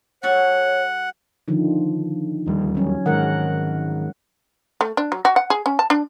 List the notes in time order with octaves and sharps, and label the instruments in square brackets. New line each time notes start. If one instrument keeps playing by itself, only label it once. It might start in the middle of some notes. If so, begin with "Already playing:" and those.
[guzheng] G3 F#4 A4 [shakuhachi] C#5 [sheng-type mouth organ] F#5
[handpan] D3 D#3 F3
[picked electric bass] D1 D#2 G3
[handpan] F#3 C#4
[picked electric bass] G#2 D#3 [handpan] G#3 A#4 F#5
[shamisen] A3
D4
F#3
F#4
F#5
G#4
C#4
A5
D4